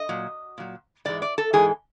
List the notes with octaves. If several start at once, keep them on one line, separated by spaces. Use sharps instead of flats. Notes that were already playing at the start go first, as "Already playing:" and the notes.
Already playing: D#5
A#2 F#3
A#2 F#3
G#2 E3 G#3 D5
D5
A4
G#2 E3 G#3 G#4